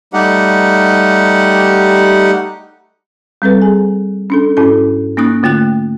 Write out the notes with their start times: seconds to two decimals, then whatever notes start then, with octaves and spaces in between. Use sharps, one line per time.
0.13 G3 A3 D#4 G4 F#5
3.42 G3 C4 A4 B4
3.62 G#4 G#5
4.30 C#4 D4 A4
4.57 G#2 C#4 E4 A4
5.17 A#3 C#4 D#4 D#6 F#6 A6
5.43 D3 A3 F4 G5 F#6